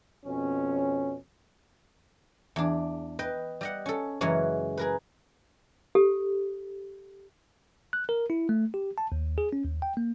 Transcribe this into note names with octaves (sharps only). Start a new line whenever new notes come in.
F2 B2 C#4
E2 D4
B4 D#5 G5
G3 D#5 F#5
C#4 A4
F#2 C#3 E3 G#3 C#4 F#4
G#4 A#4 B4
G4 A4
F#6
A#4
E4
A3
G4
A5
D#2
G#4
C#4
D#2
G5
A#3